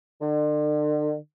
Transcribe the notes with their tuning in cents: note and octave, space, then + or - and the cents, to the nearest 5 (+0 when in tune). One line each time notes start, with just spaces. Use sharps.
D3 +40